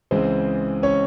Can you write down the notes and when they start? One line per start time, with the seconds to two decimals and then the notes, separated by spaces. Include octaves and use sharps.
0.11 C#2 C#3 E3 G#3 C4 C5
0.83 C#4 C#5